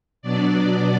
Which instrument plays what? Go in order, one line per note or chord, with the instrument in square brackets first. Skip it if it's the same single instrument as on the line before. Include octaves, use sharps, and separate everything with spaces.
[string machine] B2 F#3 B3 D4 D5